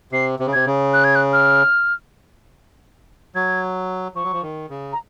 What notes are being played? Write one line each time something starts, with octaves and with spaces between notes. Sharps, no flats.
C3 C7
C3
C#3
C3 G#6
C#3
F#6
G#6
F#6
F6
F#3 G#6
F3 C#6
F#3
F3
D#3
C#3
A#5